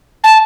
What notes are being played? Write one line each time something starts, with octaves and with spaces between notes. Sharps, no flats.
A5